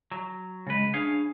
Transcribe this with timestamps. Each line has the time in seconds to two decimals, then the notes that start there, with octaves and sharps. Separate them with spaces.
0.11 F#3
0.67 C#3 G#3 B4
0.94 D4 G#4 C#5 F5